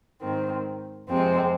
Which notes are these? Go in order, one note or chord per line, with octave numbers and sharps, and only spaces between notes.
G#2 D#3 C4
F2 C3 G#3 C4